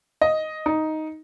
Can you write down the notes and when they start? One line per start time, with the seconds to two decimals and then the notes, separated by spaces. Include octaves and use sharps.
0.21 D#5
0.66 D#4